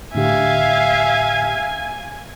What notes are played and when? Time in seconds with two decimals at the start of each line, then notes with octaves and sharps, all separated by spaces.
0.15 A2 D3 G4 E5 F5 G#5